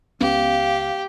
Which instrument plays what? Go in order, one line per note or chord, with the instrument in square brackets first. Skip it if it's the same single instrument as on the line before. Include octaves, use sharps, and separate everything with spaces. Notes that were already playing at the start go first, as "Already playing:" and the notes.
[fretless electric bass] C#2 B3 C#4 [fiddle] G4 [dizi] F5